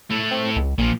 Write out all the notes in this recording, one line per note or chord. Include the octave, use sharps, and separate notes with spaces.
A3 E4
C4
C#2
A#1 A#2 F3